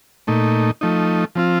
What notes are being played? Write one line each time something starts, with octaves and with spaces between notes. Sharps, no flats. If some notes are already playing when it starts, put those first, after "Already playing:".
A#2 A3 D#4
F3 A3 D#4
F3 C4 F4